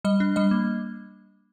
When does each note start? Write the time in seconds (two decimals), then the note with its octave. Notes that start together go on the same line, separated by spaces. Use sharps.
0.04 G3 D#5
0.20 D4
0.36 G3 D#5
0.51 A#3